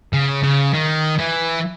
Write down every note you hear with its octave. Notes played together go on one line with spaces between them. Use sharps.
C#3
C#3
D#3
E3